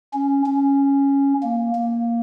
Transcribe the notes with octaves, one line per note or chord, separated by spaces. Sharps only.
C#4
C#4
A#3
A#3